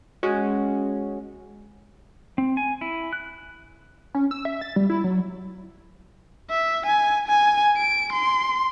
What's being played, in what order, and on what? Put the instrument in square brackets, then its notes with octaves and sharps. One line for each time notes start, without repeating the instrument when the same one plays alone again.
[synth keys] G#3 C#4 F#4
[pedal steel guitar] C4
G#5
E4
F#6
[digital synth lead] C#4
E6
E5
A6
G3
E4
F#3
[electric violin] E5
G#5
G#5
D7
C6